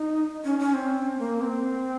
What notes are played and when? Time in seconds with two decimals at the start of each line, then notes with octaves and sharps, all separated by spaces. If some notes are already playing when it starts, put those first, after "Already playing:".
Already playing: D#4
0.44 C#4
0.59 C#4
0.74 C4
1.19 A#3
1.41 C4